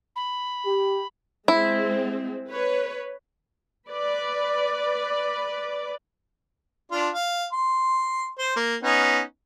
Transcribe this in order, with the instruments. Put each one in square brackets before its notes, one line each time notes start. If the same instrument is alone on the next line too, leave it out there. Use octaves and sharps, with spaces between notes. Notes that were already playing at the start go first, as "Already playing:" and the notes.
[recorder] B5
[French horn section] G4
[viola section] G#3 C4 [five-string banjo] E4
[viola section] B4 C#5
B4 D5
[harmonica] D4 F4
F5
C6
C5
A#3
B3 C#4 D#4